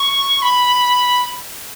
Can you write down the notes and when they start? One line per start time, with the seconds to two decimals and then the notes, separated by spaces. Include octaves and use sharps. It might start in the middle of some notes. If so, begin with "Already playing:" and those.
Already playing: C#6
0.42 B5